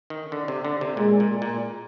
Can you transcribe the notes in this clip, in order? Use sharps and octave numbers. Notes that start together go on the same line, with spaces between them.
D#3
D3
C3
D3
C3
A#2 G#3
A#2
A#2